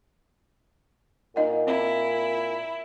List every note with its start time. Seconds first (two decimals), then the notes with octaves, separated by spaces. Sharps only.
1.36 A#2 D#4 D#5 F#5
1.67 C4 E4